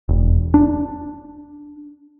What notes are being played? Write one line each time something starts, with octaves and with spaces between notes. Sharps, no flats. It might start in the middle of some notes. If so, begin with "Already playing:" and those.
E1
D4